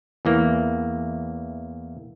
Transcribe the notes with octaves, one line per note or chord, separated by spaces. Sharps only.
E2 E3 A#3